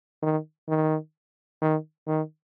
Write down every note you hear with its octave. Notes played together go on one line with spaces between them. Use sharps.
D#3
D#3
D#3
D#3